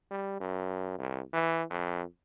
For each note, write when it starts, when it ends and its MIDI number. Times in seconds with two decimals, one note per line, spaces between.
0.11 0.36 55
0.40 0.96 42
0.98 1.21 36
1.34 1.63 52
1.70 2.03 41